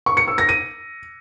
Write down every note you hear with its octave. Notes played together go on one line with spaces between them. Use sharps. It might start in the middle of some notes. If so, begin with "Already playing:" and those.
C#6
C#7
E6
A#6
D#7